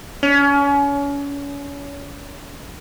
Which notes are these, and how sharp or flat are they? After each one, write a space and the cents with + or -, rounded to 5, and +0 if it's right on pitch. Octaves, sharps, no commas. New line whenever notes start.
C#4 +35